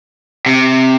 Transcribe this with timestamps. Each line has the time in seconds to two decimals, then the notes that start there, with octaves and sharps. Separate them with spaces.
0.46 C3